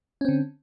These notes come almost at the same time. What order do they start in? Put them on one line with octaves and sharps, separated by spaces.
C#4 C4 D3